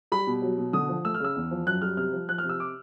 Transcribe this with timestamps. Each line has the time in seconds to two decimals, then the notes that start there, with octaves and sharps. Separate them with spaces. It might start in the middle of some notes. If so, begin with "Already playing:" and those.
0.12 G3 B5
0.27 B2
0.42 F#3
0.58 B2
0.73 D3 D#6
0.89 F3
1.05 A3 E6
1.14 F6
1.20 C#3 E6
1.36 E2
1.51 F3
1.66 F#2 F#6
1.82 G3 F6
1.97 C3 F6
2.13 F3
2.29 F3 F#6
2.38 F6
2.44 C3
2.49 E6
2.60 D6